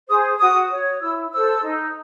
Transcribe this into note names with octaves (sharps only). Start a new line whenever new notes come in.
G#4 C5 D#6
F#4 D#6
C#5
E4 E6
A4 C5 E6
D#4